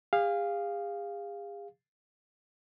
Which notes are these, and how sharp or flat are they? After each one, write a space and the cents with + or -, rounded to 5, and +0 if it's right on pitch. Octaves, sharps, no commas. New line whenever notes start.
G#4 -40 F5 +0